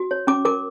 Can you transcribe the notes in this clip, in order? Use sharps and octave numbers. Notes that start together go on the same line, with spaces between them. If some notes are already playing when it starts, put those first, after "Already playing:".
Already playing: F#4
C#5
C#4 D6
A#4 D6